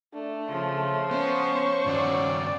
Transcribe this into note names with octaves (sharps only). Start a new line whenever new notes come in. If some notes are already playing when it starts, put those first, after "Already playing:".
A3 D4
C#3 F3
B3 C#4 B4 C5 C#6
G2 D#3 C#4 F#4 D5